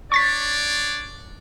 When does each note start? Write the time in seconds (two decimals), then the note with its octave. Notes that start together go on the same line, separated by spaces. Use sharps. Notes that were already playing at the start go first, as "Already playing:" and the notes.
0.12 D4 C#5 D5 C#6 A6 B6